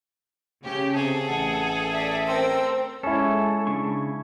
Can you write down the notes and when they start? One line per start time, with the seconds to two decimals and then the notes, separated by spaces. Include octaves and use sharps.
0.64 C#3 G4
0.96 C3 G#4 A4
1.29 A1 F#5
1.93 D5 E5
2.27 C4 A#4 G5 C6 E6
3.03 G#3 C#4 E4 A4
3.67 C#3 D4 C#6